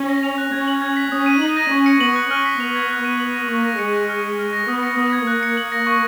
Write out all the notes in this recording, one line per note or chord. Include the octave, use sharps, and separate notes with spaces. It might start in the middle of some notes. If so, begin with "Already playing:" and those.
Already playing: C#4
A#6
F7
F#6
C#4 G#6
F#7
G#6
B6
C#4 D#6
D#7
D#4 F#7
A#6
C#4 C#6
C#7
B3 F#7
F#6
C#4 F6
B6
B3 F7
G#6
F#6
D#7
F#7
A#6
A#3 C#6
A#6
G#3 C#7
F#6
F6
C#7
F6
A#6
B3 D#6
C#7
B3 D#6
G#6
A#3 F#6
C#7
F#7
A#6
C#6